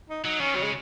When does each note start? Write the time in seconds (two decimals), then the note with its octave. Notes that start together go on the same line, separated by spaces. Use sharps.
0.10 D#4
0.24 F#3 D#4
0.40 D#3 C#4
0.55 C#3 F#3
0.63 G#3